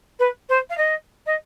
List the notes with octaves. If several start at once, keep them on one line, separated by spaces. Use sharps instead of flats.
B4
C5
F5
D#5
D#5